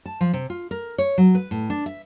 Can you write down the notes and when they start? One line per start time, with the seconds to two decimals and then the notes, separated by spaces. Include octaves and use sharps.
0.06 A5
0.21 F3
0.33 C3
0.50 F4
0.71 A#4
0.98 C#5
1.18 F#3
1.35 B4
1.51 A2
1.70 D4
1.86 E5